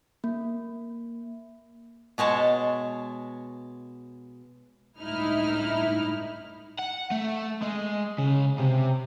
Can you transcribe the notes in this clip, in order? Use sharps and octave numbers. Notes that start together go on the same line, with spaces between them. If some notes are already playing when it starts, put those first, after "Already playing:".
A#3
B2 G#3 C#5 A5
G1 C#2 A2 D#4 E4 F6
F#5
A3
G#3
C#3
C3